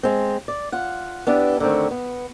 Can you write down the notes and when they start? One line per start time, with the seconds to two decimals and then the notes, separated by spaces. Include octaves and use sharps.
0.03 G#3 C4
0.48 D5
0.72 F4 F#5
1.27 B3 D4 E4 G4 B4
1.60 D3 D#3 A3 C4
1.91 B3